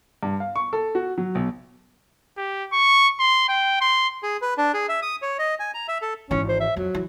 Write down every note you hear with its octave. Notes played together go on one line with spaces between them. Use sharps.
G2
F5
C#6
A4
F#4
F#3
B1
G4
C#6
C6
G5
C6
G#4
B4
D4
G#4
E5
D#6
C#5
D#5
G#5
A#5
E5
A4
G#1 E3 C#4
C5
E5
F2 F#3
E3